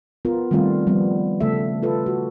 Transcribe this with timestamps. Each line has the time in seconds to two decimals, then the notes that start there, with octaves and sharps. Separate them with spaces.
0.25 B3 F4 A#4
0.51 D#3 G3 A3 C4 F4
0.87 F3 G3 B3
1.41 C#3 A3 A4 E5
1.83 F4 A4 B4
2.06 F#4